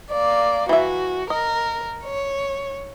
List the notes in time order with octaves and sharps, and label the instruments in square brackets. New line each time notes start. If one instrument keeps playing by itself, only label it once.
[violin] A#3 D5
[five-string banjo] E3 E5 [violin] F#4
[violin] A#4 [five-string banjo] D#5
[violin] C#5